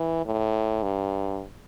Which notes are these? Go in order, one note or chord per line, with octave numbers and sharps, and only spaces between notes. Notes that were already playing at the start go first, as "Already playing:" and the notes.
Already playing: E3
A2
G2